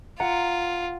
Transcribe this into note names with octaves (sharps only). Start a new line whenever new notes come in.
F4 F#5 A#5